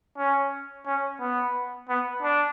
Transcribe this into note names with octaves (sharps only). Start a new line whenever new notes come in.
C#4
C#4
B3
B3
D4